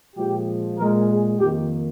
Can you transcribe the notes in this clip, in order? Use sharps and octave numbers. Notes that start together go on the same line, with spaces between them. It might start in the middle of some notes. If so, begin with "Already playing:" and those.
A#2 F3 G#3 G4
A#2 G#3 A#4
G#4
F2 D#3 A#3 G4